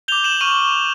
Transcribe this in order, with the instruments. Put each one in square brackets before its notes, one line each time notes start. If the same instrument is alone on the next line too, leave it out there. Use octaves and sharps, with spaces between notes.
[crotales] D6 G6 F7 G7
E7 F#7
C#6 F6 D#7 F7